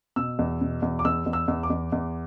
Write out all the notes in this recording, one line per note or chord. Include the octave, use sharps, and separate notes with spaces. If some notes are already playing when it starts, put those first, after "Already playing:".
B2 E6
E2
B2
E2
D6
E2 E6
E2
E6
E2
D6
E2
E2